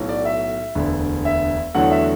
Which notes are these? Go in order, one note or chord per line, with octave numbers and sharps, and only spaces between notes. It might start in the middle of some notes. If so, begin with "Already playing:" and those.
Already playing: B1 A2 F#3
D5
E5
E1 D2 D3
E5
E2 D3 F#3 A3 F#5
E5